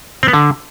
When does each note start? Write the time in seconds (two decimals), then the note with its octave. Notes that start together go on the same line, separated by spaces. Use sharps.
0.23 C4
0.28 B3
0.33 D3